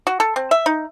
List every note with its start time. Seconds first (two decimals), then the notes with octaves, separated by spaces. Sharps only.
0.07 F#4
0.20 A4
0.36 C4
0.51 E5
0.66 D#4